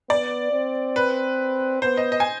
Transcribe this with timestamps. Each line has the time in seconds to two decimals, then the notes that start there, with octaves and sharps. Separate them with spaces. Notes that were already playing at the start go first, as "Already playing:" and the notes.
0.09 B3 D5
0.52 C4
0.96 B4
1.82 B3 C5
1.97 D#5
2.12 D#5
2.20 G#5